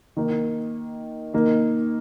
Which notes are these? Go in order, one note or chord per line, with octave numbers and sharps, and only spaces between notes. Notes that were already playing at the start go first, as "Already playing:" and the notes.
D#3 A#3 D#4
D#3 A#3 D#4